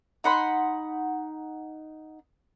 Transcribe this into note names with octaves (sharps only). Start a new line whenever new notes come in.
D#4 F#5 B5 C6